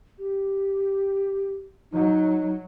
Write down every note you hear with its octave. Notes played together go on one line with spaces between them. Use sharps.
G4
F#3 D#4